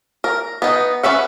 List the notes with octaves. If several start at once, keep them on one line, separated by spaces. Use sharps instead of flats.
A#4
B3 D#4
C#4 B4 E5 F#5